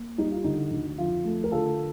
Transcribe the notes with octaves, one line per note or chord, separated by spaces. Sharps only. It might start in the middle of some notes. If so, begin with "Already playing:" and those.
Already playing: A#3
G3 D#4
F4
D3 D#4
D2
F2 F4
A3
A#4
D3 F4 A4